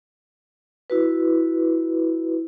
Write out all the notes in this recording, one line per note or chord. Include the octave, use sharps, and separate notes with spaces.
E4 F#4 B4